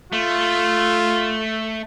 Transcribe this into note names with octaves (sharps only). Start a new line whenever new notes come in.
A3 F4